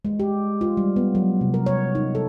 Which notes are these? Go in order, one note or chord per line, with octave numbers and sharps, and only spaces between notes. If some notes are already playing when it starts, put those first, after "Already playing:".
G#3
G4
F4
G3
B3
F#3
C3
A#4
C#5
D#4
A4